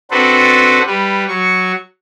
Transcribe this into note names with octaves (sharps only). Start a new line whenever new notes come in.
C4 D4 F#4 A4 B4 C5
G3 B4
F#3 C#6